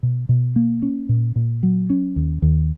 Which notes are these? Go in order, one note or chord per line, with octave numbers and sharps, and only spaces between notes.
B2
B2
A#3
C#4
A#2
A#2
F#3
C#4
D#2
D#2